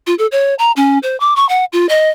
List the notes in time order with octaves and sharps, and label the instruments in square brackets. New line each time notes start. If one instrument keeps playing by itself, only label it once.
[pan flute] F4
A4
C#5
A#5
C#4
C5
D6
C#6
F#5
F4
D#5